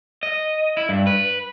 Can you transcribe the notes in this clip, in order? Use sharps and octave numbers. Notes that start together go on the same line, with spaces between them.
D#5
E4
G2
B4